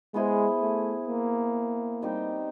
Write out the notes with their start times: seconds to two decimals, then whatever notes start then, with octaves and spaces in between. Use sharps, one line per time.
0.14 G#3 B3 E4 G#4 C5
0.61 A3
1.08 A#3
2.02 G3 C4 D#4 G4